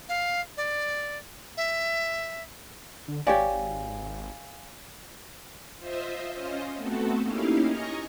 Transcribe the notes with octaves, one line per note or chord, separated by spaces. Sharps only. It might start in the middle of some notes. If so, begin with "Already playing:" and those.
F5
D5
E5
D3
G#1 G4 C#5 D5 F5 G#5
F4 C5 D#5 E5
C#4 F4 C5 D#5
A3 B3 C4 F#4 A4
A#3 C#4 D#4 E4 G4 F5
D#5 G#5 A#5 C#6